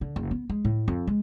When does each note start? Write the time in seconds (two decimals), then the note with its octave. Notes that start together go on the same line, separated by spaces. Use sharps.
0.01 D3
0.16 F#1
0.31 B3
0.49 G#3
0.65 A2
0.88 F2
1.07 G#3